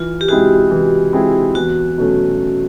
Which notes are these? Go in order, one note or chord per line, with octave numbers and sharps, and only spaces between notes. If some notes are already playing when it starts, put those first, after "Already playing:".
Already playing: E3 F4
G4
G#3 C4 E4 F#4 G#4
E3
G#3 C4 E4 G#4
E2 F#4
B2 F#3 A3 C#4